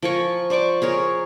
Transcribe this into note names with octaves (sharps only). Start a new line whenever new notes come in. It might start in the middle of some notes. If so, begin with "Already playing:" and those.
F3 A#4 G#5 C#6
C5 D5 C#6 D6
G#4 A#4 C#5